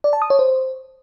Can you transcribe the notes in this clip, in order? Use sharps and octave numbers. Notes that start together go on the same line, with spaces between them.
D5
A5
D#6
C#5
C5